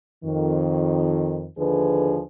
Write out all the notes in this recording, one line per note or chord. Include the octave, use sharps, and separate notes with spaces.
F2 D#3
D#2 D3 F3 G#4 B4